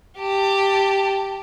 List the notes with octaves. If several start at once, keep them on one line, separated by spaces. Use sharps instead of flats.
G4 A5